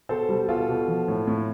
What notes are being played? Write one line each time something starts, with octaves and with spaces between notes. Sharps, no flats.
B2 A4 C5
G3
B2 F4 A4
B2
F3
A2
A2